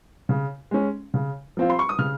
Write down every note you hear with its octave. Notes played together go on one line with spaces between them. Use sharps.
C#3
G#3 C#4
C#3
F3 C4 F4
C6
C#6
D#6
C#3 F6